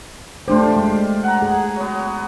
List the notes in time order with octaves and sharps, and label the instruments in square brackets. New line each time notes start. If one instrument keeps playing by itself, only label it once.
[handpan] A3 D4 C5 [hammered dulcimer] F4 G4
[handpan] G#3
[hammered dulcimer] F#5 A#5
[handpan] G#4
[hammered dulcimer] F#3 B3